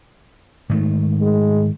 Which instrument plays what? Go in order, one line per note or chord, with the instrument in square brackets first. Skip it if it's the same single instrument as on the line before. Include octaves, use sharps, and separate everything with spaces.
[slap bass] G#2 D#3 A3
[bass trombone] G#3